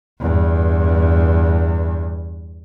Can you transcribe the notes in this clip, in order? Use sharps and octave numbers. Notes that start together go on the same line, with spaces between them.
E2 G2